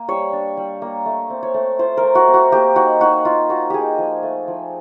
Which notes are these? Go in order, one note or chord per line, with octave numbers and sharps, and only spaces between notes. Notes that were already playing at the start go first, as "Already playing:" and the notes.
Already playing: A#3
G3 C#5
D4
G3
A#3
A3
C4
C#5
A3
F4 C5
A#4
A3
F#4
C4
F#4
A#3 G4
D#4 F#4
D#4 F#4
A#3 F4
A#3 F#4
D#4 G4 G#4
F3
A3
F3